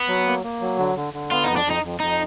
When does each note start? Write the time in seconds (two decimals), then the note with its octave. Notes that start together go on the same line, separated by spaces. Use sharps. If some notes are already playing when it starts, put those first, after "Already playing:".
Already playing: B3
0.08 F#3
0.27 A#3
0.43 A#3
0.61 F#3
0.78 D3
0.96 D3
1.13 D3
1.31 B3 F4
1.44 F2 D#4
1.56 D4
1.65 F2
1.70 D#4
1.83 F2
2.00 F2 D#4